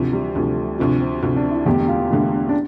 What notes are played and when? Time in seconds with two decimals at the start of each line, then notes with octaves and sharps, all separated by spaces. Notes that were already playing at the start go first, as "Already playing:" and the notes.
Already playing: D2 C3 E3 F3
0.13 G3
0.35 D2 C3 F3 A3
0.78 D2 C3 F3
1.01 C4
1.22 D2 C3 F3 C4
1.36 D4
1.51 E4
1.66 E1 E2 D3 A3 G4
1.88 F4
2.10 E1 E2 D3 A3
2.49 D4